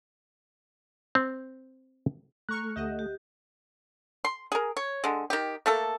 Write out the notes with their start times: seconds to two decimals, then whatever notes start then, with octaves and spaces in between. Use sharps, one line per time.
1.15 C4
2.49 A3 A#5 C#6 F6 F#6
2.76 D2 G4 D#5 E5 F#5
2.99 G4
4.25 C6
4.52 G#4 A#4
4.77 C#5
5.04 D3 G#3
5.30 D#3 G4
5.66 A3 A#3 A4